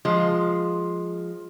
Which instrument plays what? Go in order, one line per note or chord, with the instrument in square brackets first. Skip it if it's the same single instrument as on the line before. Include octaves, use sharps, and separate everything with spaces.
[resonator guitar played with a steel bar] F3 G#3